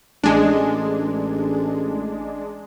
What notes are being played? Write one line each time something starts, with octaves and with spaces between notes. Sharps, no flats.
A1 G#3 D4